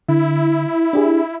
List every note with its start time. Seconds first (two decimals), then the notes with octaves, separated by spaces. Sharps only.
0.09 D3 E4
0.93 D4 G4 G#4